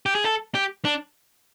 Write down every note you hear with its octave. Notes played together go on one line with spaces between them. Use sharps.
G4
G#4
A4
G4
D4